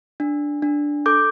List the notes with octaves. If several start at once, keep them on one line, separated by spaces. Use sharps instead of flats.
D4
D4
A4 D6 G6